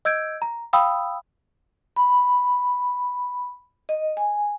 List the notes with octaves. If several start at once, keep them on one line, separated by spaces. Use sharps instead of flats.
D#5 E6 G6 G#6 D7
A#5
F5 G5 B5 D#6 E6
B5
D#5
G#5